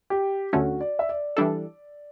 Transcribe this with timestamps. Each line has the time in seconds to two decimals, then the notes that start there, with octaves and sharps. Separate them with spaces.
0.10 G4
0.53 D2 D3 A3 C#4 F#4
0.81 D5
0.99 E5
1.09 D5
1.37 E3 G3 D4 A4